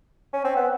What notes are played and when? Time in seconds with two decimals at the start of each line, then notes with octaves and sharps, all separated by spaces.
0.33 C#4
0.45 C4
0.57 B3